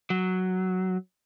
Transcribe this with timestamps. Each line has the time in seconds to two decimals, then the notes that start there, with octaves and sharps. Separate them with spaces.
0.10 F#3